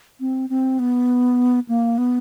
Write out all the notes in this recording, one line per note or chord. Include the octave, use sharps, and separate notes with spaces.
C4
C4
B3
A#3
B3